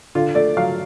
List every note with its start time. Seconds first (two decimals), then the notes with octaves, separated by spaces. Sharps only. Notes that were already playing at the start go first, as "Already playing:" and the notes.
0.15 D3 F4
0.35 A3 D5
0.57 F#3 F5